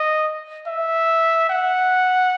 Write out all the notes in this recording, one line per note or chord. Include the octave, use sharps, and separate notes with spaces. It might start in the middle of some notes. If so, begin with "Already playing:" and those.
Already playing: D#5
E5
F#5